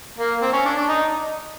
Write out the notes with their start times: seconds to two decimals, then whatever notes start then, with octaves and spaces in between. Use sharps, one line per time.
0.18 A#3
0.42 C4
0.53 C#4
0.65 D4
0.77 D4
0.88 D#4